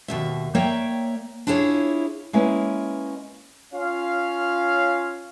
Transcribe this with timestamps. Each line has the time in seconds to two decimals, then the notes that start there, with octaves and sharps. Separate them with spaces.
0.08 D#2 B2 E5
0.55 A#3 C#5 D5 E5 G5
1.47 D4 E4 F4 G#4 C5 C#5
2.33 G#3 A#3 C#4 E4 B4
3.74 C#4 F4 F5